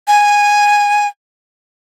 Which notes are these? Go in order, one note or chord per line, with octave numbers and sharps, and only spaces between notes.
G#5